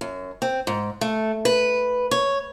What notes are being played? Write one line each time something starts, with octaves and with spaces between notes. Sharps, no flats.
F#2
C4
G#2
A3
B4
C#5